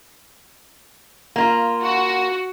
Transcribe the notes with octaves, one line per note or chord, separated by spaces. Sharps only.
A#3 F4
F#4